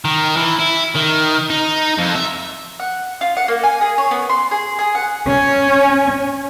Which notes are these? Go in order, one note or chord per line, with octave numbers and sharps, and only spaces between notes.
D#3
E3
E4
D#3
D#4
F2
E5
F#5
F4
F#5
A#3
G#5
G#4
C#5
B3
C6
G#4
G#4
F#5
C#4